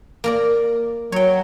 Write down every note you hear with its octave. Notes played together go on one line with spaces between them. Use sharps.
A#3 A#4 D5
F#3 C#5 G5